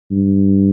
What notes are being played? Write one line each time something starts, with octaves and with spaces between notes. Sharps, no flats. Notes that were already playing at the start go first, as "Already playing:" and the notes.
G2